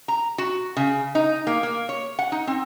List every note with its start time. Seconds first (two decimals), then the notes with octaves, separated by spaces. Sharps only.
0.08 A#5
0.38 F#4
0.77 C#3
1.15 D#4
1.47 A#3
1.63 A#3
1.89 C#5
2.19 F#5
2.32 D#4
2.47 C4